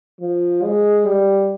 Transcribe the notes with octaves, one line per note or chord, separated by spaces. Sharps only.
F3
G#3
G3